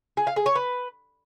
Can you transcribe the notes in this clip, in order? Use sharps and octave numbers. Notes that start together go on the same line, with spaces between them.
G#4
F5
G#4
C#5
B4